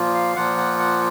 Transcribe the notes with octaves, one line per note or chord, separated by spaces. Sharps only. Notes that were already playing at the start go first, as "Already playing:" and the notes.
Already playing: A#2 F3 A#3 F4
F5
A#2 F3 A#3 F4 F#5
F#5
F#5